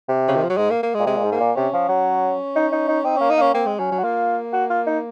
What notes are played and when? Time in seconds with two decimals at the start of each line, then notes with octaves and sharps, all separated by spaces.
0.08 C3
0.28 C#3
0.36 D#3
0.43 F3
0.50 F#3
0.57 G#2 G#3
0.70 A#3
0.83 A#3
0.94 G#3
0.99 A#2
1.06 C3 G#3
1.17 A#2
1.24 G#2
1.32 A#3
1.40 A#2
1.56 C3 C#4
1.73 F3
1.89 F#3
2.56 D#4
2.72 D#4
2.88 D#4
3.05 C4 D#4
3.17 A#3 C#4
3.30 D#4
3.37 A#3 C#4
3.54 A#3 C4
3.66 G#3
3.79 F#3 C#4
3.91 F#3
3.99 F#4
4.04 A#3 F4
4.53 F#4
4.70 F4
4.87 D#4